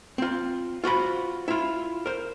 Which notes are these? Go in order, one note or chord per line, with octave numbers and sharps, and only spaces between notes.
C4 F4
F4 F#4 C5 B5
E4 F4
A#4 C5